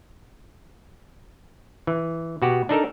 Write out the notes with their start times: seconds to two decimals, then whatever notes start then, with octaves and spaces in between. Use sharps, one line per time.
1.87 E3
2.42 B2 F#4 G4
2.69 D4 D#4 A4 A#4